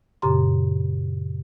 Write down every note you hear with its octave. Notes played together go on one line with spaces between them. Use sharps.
F#2 A#2 C#3 G4 A#5 C6